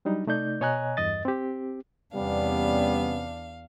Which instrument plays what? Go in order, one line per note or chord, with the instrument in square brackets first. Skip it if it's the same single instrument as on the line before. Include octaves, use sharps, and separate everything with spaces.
[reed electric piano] F#3 G3 D4 D#4
C3 A3 D#4 D5 G6
B2 C#5 D#5 G#5 A#5 F#6
E2 G2 D#5 A6
C4 G4
[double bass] E2 D4 [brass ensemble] C3 B3 C#4 [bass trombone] G3 [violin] F5